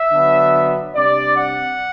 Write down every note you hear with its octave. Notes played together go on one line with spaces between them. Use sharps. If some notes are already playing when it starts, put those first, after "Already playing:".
Already playing: E5
D3 F#3 B3 D4
C3 G3 D4 D5
F#5